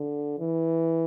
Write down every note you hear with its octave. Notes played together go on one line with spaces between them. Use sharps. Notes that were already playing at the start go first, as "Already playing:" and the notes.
Already playing: D3
E3